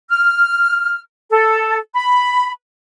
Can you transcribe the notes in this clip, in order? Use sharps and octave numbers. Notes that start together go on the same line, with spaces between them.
F6
A4
B5